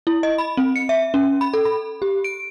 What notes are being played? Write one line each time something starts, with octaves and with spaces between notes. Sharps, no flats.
E4
D#5
B5
C4
C#7
E5
C#4
B5
A4
B5
G4
D7